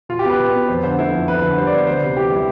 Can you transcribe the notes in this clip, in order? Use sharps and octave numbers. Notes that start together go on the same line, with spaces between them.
B2 F4
G4
B3
B4
B2
B3
F2 C5
D3 C5
A3 E4
F2
F2 B4
D3 B4
G3 C5
D5
B3 C5
D2 C5
C3
E3 G4
G3 E4